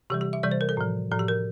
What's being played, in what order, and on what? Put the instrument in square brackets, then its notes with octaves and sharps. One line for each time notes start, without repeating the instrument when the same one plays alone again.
[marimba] C3 E3 G3 G4
G4
E5
C3 E3 G3 D5
C5
A#4
A4
A2 F3
A2 F3 A4
G4
A#4